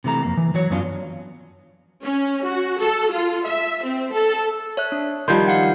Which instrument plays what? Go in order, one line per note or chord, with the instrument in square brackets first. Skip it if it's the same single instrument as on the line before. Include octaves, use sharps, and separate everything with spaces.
[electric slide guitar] C3 E3 A3 A#5
F2 G#2 A#3
E3
E3 F#3 C#5
F#2 B3 C#4 D4 F4
[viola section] C#4
F#4
A4
F4
E5
C4
A4
[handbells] C#5 E5 F#6
D4
[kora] D#3 F3 G3 [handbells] C6 G6 G#6
[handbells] F5 F#5